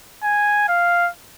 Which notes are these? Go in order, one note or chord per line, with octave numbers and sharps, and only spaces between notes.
G#5
F5